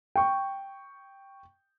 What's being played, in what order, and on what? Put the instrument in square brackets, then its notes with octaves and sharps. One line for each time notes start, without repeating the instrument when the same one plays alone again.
[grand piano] G5 C#6